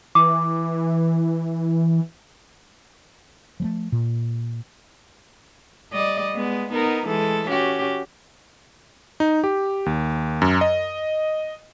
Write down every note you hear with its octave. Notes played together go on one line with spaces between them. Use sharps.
E3 D6
F3 G#3 A3
A#2
G3 D5 D#5
G#3 B3
B3 D#4 A#4
E3 G#3 A4
C#4 F#4 G4
D#4
G4
D#2
F#2
D#5